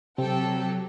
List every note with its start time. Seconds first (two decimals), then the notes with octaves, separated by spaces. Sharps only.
0.18 C3 F#3 C4 G4 A4 G5